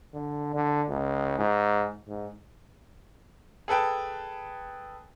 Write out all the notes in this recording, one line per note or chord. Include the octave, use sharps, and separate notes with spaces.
D3
D3
C#2
G#2
G#2
G#4 A4 B4 G5 A5